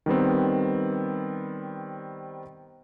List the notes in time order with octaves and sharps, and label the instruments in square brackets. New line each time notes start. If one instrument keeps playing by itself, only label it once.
[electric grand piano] D#3 G3 B3 C4